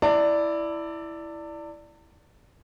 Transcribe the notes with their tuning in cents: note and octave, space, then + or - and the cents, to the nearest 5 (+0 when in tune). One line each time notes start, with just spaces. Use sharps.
E4 +0 D5 +0 A5 +45